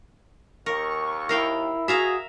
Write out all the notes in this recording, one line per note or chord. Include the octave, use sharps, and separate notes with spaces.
D#2 A#4 C#6
E4 A#4 F5 G5
F#4 G#4 E5 F5 A#5